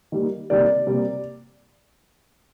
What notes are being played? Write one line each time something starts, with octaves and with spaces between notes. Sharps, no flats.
D#3 G3 A#3
C3 D#3 G3 A#3 D5
C3 G3 A#3